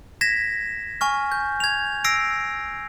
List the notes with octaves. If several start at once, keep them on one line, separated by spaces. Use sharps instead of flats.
G#6 A#6 B6 E7
G#5 C#6 F6
G6
G#6 F7
E6 A#6 C7 D7